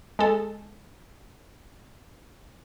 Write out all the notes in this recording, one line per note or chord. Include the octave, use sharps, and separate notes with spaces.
G#3 A4